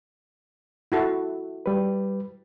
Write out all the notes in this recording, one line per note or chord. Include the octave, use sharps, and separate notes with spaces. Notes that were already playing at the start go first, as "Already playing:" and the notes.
E4 F#4 A4
G3 B4